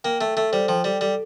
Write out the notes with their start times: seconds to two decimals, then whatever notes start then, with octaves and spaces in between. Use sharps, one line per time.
0.04 A#3 G5
0.21 A3 A4
0.37 A3 A4
0.52 G3 C5
0.69 F3 G5
0.84 G3 A4
1.01 G3 A4